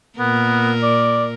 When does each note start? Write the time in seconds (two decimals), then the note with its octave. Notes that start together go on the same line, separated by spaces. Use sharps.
0.19 A#2 B3 A#4
0.83 D5